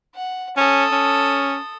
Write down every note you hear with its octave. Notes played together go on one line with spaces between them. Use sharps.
F#5
C#4 A4 D#6
C#4